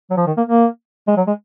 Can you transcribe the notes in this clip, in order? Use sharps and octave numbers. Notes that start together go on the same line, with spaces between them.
F#3
F3
D#3
A#3
A#3
G#3
F#3
G#3